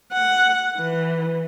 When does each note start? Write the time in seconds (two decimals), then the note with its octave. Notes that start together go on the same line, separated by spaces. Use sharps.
0.13 F#5
0.77 E3